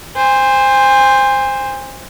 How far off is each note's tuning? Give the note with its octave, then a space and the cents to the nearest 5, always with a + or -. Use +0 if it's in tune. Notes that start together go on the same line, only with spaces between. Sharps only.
C5 +0 G#5 -35